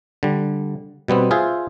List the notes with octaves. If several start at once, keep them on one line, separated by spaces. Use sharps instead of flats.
D3 G3
B2 G3 B3 C4
F4 G#4 C5 E5